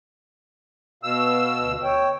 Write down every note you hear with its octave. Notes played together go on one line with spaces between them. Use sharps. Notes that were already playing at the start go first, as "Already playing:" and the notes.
B2 F5 E6
D2
C#5 G5